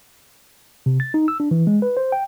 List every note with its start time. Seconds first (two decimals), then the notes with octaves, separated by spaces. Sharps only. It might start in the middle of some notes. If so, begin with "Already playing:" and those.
0.86 C3
1.00 A6
1.14 D#4
1.28 E6
1.40 D4
1.51 E3
1.67 G#3
1.82 B4
1.97 C5
2.12 G5